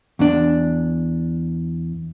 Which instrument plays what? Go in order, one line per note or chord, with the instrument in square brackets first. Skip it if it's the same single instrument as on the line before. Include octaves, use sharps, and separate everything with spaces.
[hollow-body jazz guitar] E2 D4